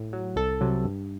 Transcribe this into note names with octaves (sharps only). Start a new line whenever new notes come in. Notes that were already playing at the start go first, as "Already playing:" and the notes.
Already playing: A2
F#3
C2 A4
C3 F#3
G2